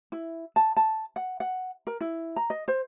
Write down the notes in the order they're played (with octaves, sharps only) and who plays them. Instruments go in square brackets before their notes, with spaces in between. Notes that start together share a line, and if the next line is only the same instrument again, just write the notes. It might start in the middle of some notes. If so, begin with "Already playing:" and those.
[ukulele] E4
A5
A5
F#5
F#5
A#4
E4
A#5
D#5
C5